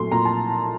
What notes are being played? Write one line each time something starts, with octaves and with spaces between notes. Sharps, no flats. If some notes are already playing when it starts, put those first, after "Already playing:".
Already playing: A#2 F#3 A3 C6
A#2 A#5
A5